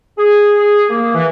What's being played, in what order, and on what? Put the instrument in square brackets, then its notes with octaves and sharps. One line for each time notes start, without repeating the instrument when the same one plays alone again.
[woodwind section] G#4
A#3
E3